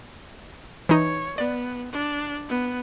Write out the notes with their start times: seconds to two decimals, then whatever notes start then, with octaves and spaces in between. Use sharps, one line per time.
0.89 E3 D#4 C#5
1.38 B3 D5
1.92 D4
2.49 B3